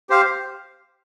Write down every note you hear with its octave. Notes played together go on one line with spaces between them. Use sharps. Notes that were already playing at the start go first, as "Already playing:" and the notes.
G4 C5 F5